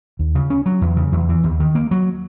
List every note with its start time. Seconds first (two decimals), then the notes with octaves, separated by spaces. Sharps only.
0.19 D#2
0.35 C#3
0.50 C#4
0.66 F#3
0.81 E2
0.97 C#3
1.12 E2
1.29 E3
1.44 D#2
1.60 D#3
1.75 A#3
1.91 F#3